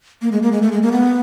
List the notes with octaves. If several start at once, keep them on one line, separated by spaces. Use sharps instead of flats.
A#3
G#3
A#3
G#3
A3
G#3
A#3
B3